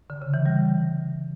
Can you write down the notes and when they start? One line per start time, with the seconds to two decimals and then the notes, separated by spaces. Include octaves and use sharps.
0.10 D3
0.22 C#3
0.34 E3
0.46 G3